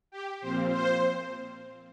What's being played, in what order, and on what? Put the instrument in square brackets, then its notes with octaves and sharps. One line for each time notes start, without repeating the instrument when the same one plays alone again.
[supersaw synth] G4
[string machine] A#2 F3 C4 F4 [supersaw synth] C5
[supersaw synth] C5